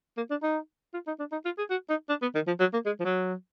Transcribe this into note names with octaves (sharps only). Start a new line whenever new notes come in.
A#3
D4
D#4
F4
D#4
D4
D#4
F4
G#4
F#4
D#4
D4
B3
D#3
F3
F#3
A#3
G#3
F3
F#3